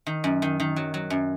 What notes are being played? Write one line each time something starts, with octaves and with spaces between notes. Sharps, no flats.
D#3
F#2
D#3
D#3
F#3
F#3
F#2